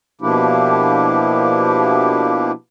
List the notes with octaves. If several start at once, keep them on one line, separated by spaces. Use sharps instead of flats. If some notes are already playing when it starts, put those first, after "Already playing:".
B2 F3 A#3 D4 E4 G4